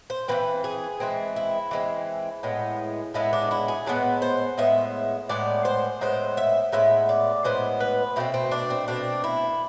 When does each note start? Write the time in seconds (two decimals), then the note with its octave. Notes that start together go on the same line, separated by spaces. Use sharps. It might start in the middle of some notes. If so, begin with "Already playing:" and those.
0.10 C5
0.28 E3 G#3 C4 B4
0.64 G#4
1.00 E3 G#3 C4
1.36 E4
1.71 E3 G#3 C4
2.43 A2 G#3 B3
3.14 A2 G#3 B3 E4
3.33 D4
3.51 E4
3.68 G#4
3.87 A2 G#3 B3 A4
4.22 C5
4.58 A2 G#3 B3 E5
5.29 A2 G#3 B3 D5
5.65 C5
6.01 A2 G#3 B3 C5
6.37 E5
6.72 A2 G#3 B3 E5
7.09 D5
7.44 A2 G#3 B3 C5
7.80 B4
8.16 B2 A3 C4 E4
8.34 C4
8.51 D4
8.70 C4
8.88 B2 A3 C4 D4
9.24 E4